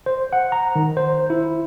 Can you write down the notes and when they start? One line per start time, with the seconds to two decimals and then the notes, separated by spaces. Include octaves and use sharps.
0.06 C5
0.33 F#5
0.52 A#5
0.76 D#3
0.97 C5
1.30 E4